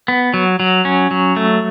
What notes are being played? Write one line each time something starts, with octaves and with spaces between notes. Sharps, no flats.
B3
F#3
F#3
C#4
F#3
A3